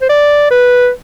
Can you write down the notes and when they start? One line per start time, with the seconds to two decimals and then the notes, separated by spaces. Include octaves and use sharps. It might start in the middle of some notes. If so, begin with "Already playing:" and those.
0.02 C5
0.10 D5
0.51 B4